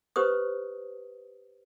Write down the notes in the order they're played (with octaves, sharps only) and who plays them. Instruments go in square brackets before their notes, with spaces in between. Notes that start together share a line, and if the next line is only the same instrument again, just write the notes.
[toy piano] G4 B4 C5 D#6